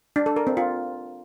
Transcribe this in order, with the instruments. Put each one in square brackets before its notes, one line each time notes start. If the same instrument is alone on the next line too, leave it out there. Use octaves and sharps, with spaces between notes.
[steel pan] D4
A4
A#4
C4
F4